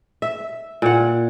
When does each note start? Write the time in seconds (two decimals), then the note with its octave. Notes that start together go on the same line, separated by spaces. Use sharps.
0.22 E5
0.82 A#2 F#5